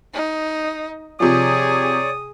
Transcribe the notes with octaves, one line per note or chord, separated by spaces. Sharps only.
D#4
C3 F3 G#4 C#5 D5 D#6